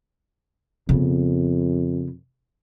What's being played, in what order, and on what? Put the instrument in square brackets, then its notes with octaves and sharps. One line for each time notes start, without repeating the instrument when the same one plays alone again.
[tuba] F2 [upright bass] C#3 B3